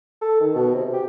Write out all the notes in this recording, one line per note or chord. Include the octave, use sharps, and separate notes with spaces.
A4
D#3
B2
C3
G4